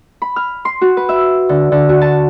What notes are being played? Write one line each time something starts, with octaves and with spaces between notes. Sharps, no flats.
B5
F6
C6
F#4
B4
E5
D3
D3
F#4
A5